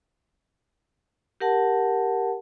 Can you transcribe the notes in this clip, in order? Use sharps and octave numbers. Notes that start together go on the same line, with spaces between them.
G4 A#4 F#5 A5